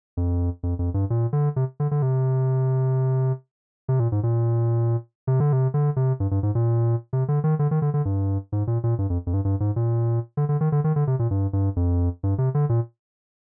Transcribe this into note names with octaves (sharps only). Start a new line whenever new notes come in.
F2
F2
F2
G2
A#2
D3
C3
D3
D3
C3
C3
A#2
G#2
A#2
C3
D3
C3
D3
C3
G2
G2
G#2
A#2
C3
D3
D#3
D3
D#3
D3
D3
G2
G#2
A#2
A#2
G2
F2
F2
G2
G2
G#2
A#2
D3
D3
D#3
D3
D#3
D3
C3
A#2
G2
G2
F2
G2
C3
D3
A#2